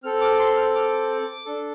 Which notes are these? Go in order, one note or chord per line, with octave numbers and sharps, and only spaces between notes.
C4 A4 F6
D6
C6
F6
D6
D4 A4